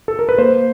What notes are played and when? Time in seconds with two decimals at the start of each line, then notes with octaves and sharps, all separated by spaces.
0.08 A4
0.19 A#4
0.29 B4
0.38 A#3 C5